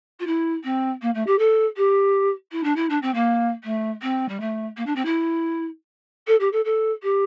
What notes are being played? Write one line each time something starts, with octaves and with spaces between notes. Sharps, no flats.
F4
E4
C4
A#3
A3
G4
A4
G4
E4
D4
E4
D4
C4
A#3
A3
C4
G3
A3
A#3
D4
C4
E4
A4
G4
A4
A4
G4